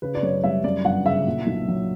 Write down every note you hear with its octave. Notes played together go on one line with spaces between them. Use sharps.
C#3 B4
D5
F#2 C#5
G3 E5
F#2 D5
G1 F#5
C#3 E5
A#2
B1
F#3